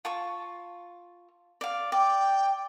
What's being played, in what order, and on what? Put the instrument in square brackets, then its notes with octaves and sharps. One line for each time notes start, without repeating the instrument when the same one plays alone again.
[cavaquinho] F4 A5 C#6
D5 F5
[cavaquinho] D5 [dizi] G5